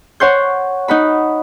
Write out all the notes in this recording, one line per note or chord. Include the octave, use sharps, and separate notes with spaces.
C#5 F#5 C6 G6
D#4 F#5 B5